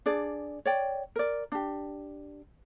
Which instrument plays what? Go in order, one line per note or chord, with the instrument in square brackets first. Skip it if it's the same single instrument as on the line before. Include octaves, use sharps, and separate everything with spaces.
[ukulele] D4 G#4 D5
C#5 D5 G5
A#4 D5
D4 G4